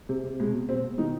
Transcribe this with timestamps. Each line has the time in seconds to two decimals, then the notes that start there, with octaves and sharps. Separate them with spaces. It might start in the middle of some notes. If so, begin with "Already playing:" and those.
0.09 C3
0.23 C3
0.40 B2 G#3
0.54 B2
0.69 B2 C4
0.84 B2
0.98 D#3 D#4